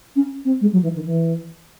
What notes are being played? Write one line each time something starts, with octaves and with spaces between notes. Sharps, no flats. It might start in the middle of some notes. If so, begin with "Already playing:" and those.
C#4
C4
G#3
F#3
E3
D#3
E3